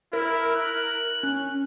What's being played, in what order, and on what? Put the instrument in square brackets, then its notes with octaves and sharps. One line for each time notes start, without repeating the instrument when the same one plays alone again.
[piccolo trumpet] E4 [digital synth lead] A#4
[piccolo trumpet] F#6
[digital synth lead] C#4